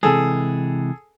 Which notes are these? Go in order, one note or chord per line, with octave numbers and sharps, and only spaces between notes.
C3 E3 G#3 G#4 A4